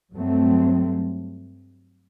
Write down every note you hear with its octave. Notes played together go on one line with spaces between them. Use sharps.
G2 F#3 A3 C4